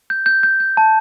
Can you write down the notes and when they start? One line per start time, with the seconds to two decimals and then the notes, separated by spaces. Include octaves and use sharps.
0.10 G6
0.26 G6
0.43 G6
0.60 G6
0.77 A5